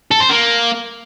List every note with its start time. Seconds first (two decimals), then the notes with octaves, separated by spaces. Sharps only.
0.11 A4
0.20 C5
0.29 A#3